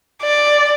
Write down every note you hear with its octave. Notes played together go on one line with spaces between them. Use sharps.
D5